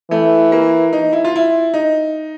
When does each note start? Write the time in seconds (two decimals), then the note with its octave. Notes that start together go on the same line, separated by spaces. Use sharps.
0.11 E3 A3
0.52 A#3
0.93 D#4
1.13 E4
1.24 F4
1.36 E4
1.74 D#4